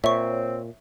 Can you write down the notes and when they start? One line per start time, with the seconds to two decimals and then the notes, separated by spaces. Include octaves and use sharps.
0.04 A#2 C4 C#5 E5 C#6